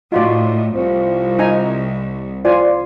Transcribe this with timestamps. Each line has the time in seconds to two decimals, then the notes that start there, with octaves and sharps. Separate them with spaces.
0.12 A2 D#4 F4 F#4 D5
0.75 C2 F3
1.39 D#4 G#5 A#5
2.45 F4 C5 D5 G#5